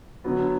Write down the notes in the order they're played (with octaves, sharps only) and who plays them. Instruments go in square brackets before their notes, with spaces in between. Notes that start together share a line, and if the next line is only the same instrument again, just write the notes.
[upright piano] D3 F#3 B3